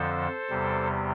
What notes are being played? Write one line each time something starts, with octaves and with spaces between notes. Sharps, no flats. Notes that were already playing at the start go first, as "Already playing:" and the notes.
Already playing: F2 D3 F3 A4 C5
E2 C3 G3